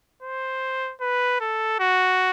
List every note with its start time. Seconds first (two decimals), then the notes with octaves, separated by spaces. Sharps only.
0.23 C5
1.01 B4
1.40 A4
1.80 F#4